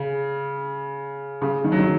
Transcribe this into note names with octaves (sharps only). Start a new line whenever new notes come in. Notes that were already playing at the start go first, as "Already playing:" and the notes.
Already playing: C#3
C#3
D#3
F#3
D#3